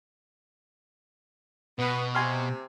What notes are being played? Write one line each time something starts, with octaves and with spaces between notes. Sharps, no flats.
B2 B3
C3 G#5 C6 F6